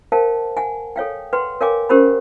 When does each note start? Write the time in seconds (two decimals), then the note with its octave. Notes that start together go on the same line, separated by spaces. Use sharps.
0.12 A#4 C5 F5 G5 A5
0.57 F#5 G#5
0.96 A4 C#5 F5 G5
1.33 B4 F#5 G5 C6
1.61 A#4 C#5 F5 G5 G#5 D6
1.89 C#4 G4 A#4 C5 F#5 B5